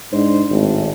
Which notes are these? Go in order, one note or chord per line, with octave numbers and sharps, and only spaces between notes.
G#2 D4 C5
G#1 A2